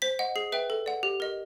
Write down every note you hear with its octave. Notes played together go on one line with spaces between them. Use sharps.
C5 B6
D#5 F#5
G#4 C7
B4 E5 G5
A4
D5 F#5
G4
A#4 D#5